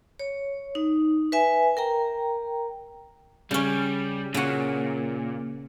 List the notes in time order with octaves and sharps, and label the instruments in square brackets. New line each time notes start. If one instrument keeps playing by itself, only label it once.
[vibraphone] C#5
D#4
B4 E5 G#5
A#4 G5 A#5
[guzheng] C#3 C#4 [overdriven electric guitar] G3
[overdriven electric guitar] A#2 [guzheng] C#3 F#4